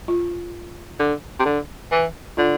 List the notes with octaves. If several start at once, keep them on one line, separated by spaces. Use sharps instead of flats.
F4
D3
C3
D3
E3
D3 F4